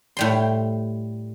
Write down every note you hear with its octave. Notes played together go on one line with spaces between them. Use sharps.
A2 G3 C6